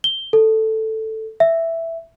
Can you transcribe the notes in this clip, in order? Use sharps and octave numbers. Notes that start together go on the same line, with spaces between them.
G7
A4
E5